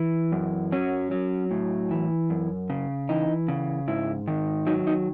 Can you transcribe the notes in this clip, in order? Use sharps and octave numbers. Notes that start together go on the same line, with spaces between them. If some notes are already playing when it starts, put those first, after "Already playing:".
Already playing: E3
F#2
F#3 C#4
F#3
A2
E3
F#2
C#3
E3 D#4
C#3
G#2 E4
D#3
F#3 D#4
D#4